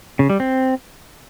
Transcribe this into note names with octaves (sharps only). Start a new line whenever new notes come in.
C#3
G3
C4